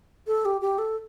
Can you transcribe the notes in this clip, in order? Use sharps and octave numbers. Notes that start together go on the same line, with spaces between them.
A4
G4
G4
A4